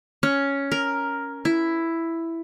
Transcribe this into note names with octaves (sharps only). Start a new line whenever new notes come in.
C#4
A#4
E4